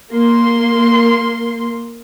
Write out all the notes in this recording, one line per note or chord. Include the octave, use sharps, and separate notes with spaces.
A#3 C6